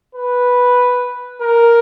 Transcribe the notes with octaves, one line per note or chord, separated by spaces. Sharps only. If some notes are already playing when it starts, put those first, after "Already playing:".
B4
A#4